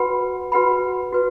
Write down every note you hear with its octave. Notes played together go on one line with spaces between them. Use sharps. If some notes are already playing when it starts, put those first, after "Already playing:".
Already playing: F#4 B4 F#5 B5
F#4 B4 F#5 B5
F#4 B4